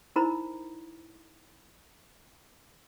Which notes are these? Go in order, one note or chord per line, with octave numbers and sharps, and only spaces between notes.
D#4 E4 A#4 C5 A#5 B5